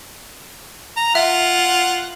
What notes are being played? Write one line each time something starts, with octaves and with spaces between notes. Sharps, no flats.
A#5
F4 E5 F#5